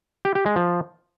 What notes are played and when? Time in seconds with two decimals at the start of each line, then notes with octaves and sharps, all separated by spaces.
0.25 G4
0.35 G4
0.46 G#3
0.56 F3